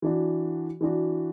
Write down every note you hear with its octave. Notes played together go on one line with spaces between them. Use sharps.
E3 D4 F#4
E3 D4 F#4